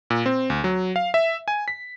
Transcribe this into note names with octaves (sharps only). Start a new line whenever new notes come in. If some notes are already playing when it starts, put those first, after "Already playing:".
A#2
C4
D2
F#3
F5
E5
G#5
B6